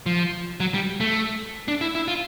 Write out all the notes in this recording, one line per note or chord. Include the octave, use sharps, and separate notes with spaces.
F3
F#3
G3
A3
D4
E4
E4
F4